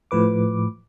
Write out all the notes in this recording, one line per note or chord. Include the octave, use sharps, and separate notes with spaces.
A2 F3 B4 D6